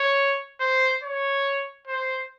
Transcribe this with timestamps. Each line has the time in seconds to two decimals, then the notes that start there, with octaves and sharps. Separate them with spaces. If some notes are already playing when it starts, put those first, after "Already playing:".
Already playing: C#5
0.60 C5
1.03 C#5
1.87 C5